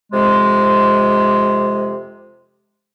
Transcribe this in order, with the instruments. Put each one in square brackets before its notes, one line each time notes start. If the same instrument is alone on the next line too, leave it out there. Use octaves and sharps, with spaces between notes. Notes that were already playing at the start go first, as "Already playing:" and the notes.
[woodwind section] F2 C3 G#3